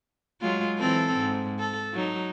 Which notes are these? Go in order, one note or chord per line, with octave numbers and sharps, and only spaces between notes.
F#3 G#3 F4
E3 C4 A4
G#2
A4
F#3 D#4